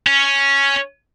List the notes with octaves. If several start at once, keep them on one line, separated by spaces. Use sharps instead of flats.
C#4